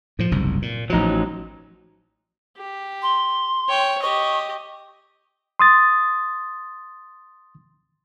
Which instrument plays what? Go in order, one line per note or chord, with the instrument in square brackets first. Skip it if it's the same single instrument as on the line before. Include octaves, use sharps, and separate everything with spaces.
[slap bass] A2 F3
F#1 C2 G#2
A#2
[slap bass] A1 F3 [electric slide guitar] F#3 D#4
[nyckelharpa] G4
[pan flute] C6
[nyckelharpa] C#5 G5
[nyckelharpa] G4 D#5 [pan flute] C#6
[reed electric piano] C6 D#6 A6